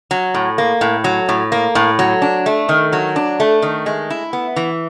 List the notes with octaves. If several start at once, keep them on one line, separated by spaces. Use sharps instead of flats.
F#3
A2
A#3
A2
F#3
A2
A#3
A2
F#3
D4
A3
D#3
F#3
D4
A3
D#3
G#3
E4
B3
E3